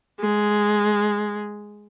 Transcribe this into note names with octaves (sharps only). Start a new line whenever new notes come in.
G#3